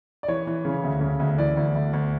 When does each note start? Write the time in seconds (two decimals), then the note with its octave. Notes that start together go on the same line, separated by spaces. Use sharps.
0.23 D5
0.28 E3 C#5
0.47 E3
0.65 C#3
0.83 D2
1.01 C#3
1.19 D2
1.38 E3 D5
1.57 D2
1.75 D2
1.93 D2